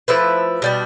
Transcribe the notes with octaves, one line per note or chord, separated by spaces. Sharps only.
F3 A3 E4 B4
B2 G3 D4